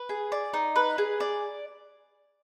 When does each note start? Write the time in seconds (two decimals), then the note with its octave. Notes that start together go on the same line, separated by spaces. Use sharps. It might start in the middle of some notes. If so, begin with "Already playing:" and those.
Already playing: B4
0.09 G#4
0.32 D5
0.54 D#4
0.76 B4
0.98 G#4
1.20 D5